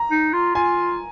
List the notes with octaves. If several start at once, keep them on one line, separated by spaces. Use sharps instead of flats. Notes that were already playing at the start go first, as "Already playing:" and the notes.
Already playing: A#5
D#4
F4
F4 G#5